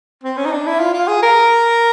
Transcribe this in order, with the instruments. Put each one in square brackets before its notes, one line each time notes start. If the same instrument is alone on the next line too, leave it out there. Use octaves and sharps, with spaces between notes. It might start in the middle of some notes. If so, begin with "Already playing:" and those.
[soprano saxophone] C4
C#4
D#4
D4
E4
F4
F4
G#4
A#4